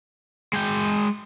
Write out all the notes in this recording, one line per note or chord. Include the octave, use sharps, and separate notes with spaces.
G#3 G5